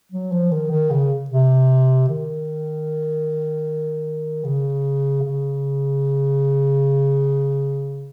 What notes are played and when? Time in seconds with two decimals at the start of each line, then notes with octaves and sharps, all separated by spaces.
0.12 F#3
0.32 F3
0.51 D#3
0.71 D#3
0.91 C#3
1.30 C3
2.09 D#3
4.44 C#3
5.23 C#3